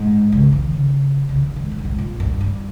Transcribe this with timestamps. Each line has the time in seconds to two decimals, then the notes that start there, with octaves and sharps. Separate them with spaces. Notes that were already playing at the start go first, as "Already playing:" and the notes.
Already playing: G#2
0.32 C#3
0.53 D#3
0.73 C#3
1.29 C#3
1.43 D#3
1.56 G#2
1.71 A#2
1.78 G2
1.85 G#2
1.99 A#2
2.20 G2
2.41 G2